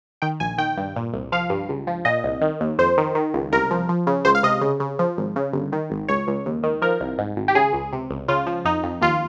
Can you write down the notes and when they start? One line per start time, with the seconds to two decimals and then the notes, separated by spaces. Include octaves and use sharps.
0.22 D#3 G5
0.40 A#1 G#5
0.58 D#3 G5
0.77 G2
0.96 A#2
1.13 C2
1.32 F3 F5
1.50 G2
1.69 C#2
1.87 F3
2.05 A#2 D#5
2.23 C2
2.41 D#3
2.61 D#2
2.78 F2 C5
2.98 D#3
3.15 D#3
3.34 C#2
3.52 C2 A#4
3.71 F3
3.89 F3
4.07 C#3
4.25 C#2 C5
4.35 F5
4.43 C3 D#5
4.61 C#3
4.80 C#3
4.99 F3
5.18 G#1
5.36 C#3
5.53 G1
5.72 D#3
5.90 G#1
6.08 C#2 C#5
6.27 C#2
6.46 D#2
6.63 D#3
6.82 F3 A#4
7.00 C2
7.18 G#2
7.36 G#1
7.48 G4
7.55 C#3 G#4
7.73 C#2
7.93 C3
8.10 C#2
8.28 C#3 F4
8.47 F3
8.65 F2 D#4
8.83 F2
9.01 D#2 F4